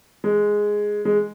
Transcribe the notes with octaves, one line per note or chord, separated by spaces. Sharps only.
G#3
G#3